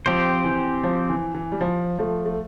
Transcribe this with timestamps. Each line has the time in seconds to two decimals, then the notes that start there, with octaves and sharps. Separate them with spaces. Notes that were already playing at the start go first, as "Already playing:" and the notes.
0.06 F3 C4 G4 C5
0.44 E3
0.83 F3
1.10 E3
1.34 E3
1.52 G3
1.61 F3
1.99 F3 A3
2.25 A3